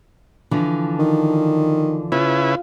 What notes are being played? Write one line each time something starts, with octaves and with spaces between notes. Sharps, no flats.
D3 E3 F3
D#3
C#3 E4 F4 B4